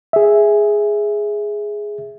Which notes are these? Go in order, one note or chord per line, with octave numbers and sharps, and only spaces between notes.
G#4 E5